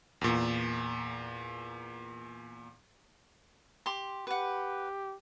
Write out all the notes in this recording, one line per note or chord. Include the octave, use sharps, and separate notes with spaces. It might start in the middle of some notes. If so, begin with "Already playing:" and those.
E2 A#2
G4 C6
G4 B4 F#5